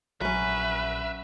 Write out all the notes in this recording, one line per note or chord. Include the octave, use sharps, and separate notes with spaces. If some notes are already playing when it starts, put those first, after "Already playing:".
A#1 F#3 C#4 B4 E5